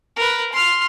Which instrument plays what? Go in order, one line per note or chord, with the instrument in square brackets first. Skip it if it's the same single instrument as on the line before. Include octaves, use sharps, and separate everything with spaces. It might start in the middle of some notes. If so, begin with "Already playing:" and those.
[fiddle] A#4 B4
C6 F6